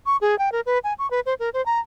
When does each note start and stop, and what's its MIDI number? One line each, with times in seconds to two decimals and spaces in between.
0.06 0.17 85
0.21 0.38 68
0.39 0.52 79
0.52 0.61 70
0.66 0.78 71
0.84 0.93 80
0.99 1.09 85
1.11 1.20 71
1.26 1.34 72
1.39 1.49 70
1.54 1.64 72
1.66 1.80 82